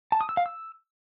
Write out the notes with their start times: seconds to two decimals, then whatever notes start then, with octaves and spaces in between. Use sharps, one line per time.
0.12 A5
0.21 D#6
0.29 E6
0.37 F5
0.46 E6